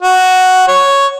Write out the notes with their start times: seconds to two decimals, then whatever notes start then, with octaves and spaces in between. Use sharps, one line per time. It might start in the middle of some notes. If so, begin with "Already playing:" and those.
0.02 F#4
0.68 C#5